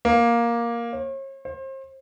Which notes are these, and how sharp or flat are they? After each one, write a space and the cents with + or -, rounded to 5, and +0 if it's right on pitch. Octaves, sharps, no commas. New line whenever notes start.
A#3 +10
C#5 -40
C5 +35